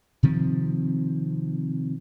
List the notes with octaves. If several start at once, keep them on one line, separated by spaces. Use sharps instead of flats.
C3 D#3 F3 C4